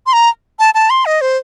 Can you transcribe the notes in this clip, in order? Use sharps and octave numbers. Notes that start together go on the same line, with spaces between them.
C6
A#5
A5
A5
C6
D#5
C5